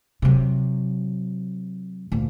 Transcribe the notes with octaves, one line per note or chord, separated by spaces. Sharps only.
C3 F#3
D2 A#2